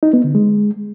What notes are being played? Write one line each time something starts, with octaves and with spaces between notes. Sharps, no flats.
D#4
B3
D3
G#3